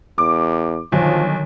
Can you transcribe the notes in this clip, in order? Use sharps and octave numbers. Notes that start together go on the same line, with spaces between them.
E2 D6
B1 D3 D#3 F3 G3